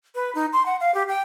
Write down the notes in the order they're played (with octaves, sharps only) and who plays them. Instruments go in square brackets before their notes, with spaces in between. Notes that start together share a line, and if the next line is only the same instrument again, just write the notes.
[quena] B4
D#4
C6
F#5
F5
G4
G5